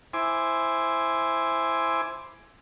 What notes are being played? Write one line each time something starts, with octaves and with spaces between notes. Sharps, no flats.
E4 C5 G#5 D6